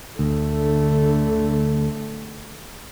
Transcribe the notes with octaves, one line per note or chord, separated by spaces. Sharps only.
D2 D3 A3